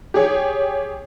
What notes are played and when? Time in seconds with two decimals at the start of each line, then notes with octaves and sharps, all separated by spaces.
0.14 G4 G#4 C#5